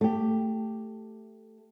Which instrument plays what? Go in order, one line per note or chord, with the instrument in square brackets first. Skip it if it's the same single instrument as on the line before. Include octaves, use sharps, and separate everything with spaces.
[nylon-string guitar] A3 G4